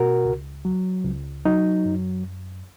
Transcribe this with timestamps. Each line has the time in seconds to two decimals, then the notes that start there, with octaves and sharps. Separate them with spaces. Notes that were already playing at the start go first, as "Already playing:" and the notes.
Already playing: B2 F#4 A#4
0.25 C#2
0.65 F#3
1.05 C#2
1.45 F#3 D#4
1.85 F#2